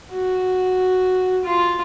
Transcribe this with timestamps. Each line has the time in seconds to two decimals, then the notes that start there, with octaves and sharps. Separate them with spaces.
0.12 F#4
1.44 F4